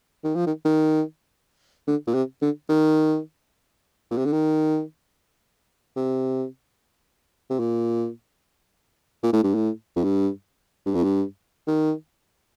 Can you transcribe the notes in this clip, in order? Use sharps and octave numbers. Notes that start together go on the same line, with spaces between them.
D#3
F3
D#3
D#3
D3
A#2
C3
D3
D#3
A#2
C3
D3
D#3
C3
C3
A#2
A#2
A2
G2
A2
F2
G2
G2
F2
G2
D#3